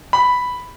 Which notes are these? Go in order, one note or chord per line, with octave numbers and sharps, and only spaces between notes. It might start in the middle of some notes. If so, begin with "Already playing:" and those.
B5